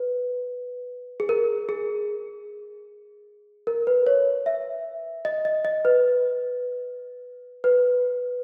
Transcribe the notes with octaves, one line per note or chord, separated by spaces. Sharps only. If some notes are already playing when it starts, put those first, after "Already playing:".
Already playing: B4
G#4
A#4
G#4
A#4
B4
C#5
E5
D#5
D#5
D#5
B4
B4